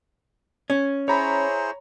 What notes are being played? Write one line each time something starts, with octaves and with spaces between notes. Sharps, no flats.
C#4
E4 G#4 C5 C#5 A#5 B5